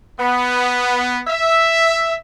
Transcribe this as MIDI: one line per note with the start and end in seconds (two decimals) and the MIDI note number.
0.19 1.21 59
1.27 2.15 76